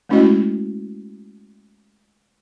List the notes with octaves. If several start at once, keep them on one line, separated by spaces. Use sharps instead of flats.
G#3 A3 C#4 E4 F#4 D#5